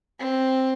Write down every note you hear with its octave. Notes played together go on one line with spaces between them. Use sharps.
C4